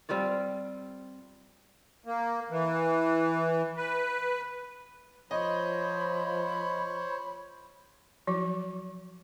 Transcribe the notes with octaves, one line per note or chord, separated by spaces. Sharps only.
G3 C4 F4 D5
A#3
E3
B4
F3 C5 C#5 D#5 B5
F3 F#3 F#4